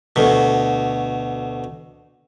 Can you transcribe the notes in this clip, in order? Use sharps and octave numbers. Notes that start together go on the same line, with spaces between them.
D2 B2